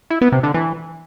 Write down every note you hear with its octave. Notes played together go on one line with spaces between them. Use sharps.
E4
B3
C3
D3
E3